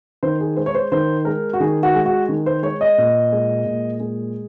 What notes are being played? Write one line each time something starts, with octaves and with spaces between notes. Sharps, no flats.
D#3 C5
G#4
G#3 C5
C#5
C5
D#3 C5
G#3 A#4
F#4
D#3 G#4
F#4
G#3
F#4
D#3
C5
G#3 C#5
D#5
A#2
G#3
A#2
G#3